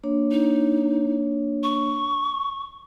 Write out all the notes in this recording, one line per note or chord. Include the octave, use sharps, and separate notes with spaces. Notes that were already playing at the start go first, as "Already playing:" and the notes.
A#3 D4 C#5
D#4
C#6